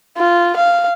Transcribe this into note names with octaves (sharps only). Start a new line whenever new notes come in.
F4
F5